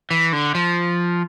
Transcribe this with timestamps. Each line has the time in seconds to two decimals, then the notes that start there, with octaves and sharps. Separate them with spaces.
0.11 E3
0.33 D3
0.55 F3